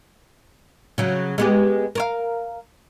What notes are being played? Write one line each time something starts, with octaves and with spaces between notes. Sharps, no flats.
C#3 F#3
G#3 B3 G4
A#4 C#5 F5